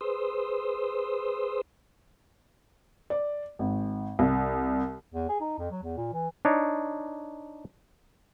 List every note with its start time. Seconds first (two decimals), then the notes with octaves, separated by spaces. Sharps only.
0.01 G#4 B4 C5 C6 D#6 E6
3.10 D5
3.59 G#1
4.19 C2
5.14 E2
5.29 G#4
5.41 D#4
5.59 F2
5.71 F#3
5.83 E2
5.98 A#2
6.13 E3
6.45 D4 D#4 C#5